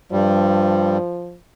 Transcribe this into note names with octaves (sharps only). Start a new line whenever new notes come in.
G2 F3 G3